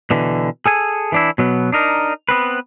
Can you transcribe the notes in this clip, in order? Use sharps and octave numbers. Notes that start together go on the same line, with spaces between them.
B2 D3 E3
G#4 A4 G#5
E3 D4 E4
B2 F#3 B3
D4 D#4 A#4
B3 C4 B4